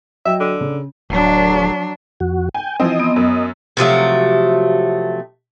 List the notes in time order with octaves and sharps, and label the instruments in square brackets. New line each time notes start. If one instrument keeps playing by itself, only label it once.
[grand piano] F#3 D#5 G5 [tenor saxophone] E5
[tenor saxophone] D3
[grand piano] C#3
[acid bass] D1 [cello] F#3 D4
[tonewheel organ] F2 F#4
[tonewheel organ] G5 [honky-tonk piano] G#5
[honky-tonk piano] E3 F3 C4 [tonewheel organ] D#5
[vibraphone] B3
[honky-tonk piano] F#2
[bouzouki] C3 F3 F#3 A3